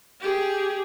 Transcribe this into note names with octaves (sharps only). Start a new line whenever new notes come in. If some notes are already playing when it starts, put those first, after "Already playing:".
G4 G#4